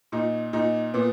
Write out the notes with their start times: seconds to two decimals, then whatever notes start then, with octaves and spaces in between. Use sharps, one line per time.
0.12 A#2 D#4
0.53 A#2 D#4
0.94 A#2 B3